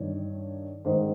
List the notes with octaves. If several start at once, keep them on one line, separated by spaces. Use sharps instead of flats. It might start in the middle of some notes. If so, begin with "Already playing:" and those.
Already playing: G2 D#3 C#5
G#2 D#3 C5